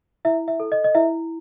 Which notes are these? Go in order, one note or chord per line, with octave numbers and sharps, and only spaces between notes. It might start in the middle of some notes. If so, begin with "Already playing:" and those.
E4 E5
E5
A4
D#5
D#5
E4 E5